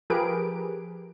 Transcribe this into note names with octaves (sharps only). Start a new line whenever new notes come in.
F3 G4 G#4 A#4 B4 D7